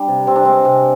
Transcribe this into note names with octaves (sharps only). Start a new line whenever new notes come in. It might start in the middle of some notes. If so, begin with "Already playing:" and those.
Already playing: G3 D4
C3
C3 C4
D4
G#3 C4
C3